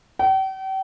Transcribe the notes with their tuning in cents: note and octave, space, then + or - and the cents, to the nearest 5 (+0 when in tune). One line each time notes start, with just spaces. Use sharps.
G5 -40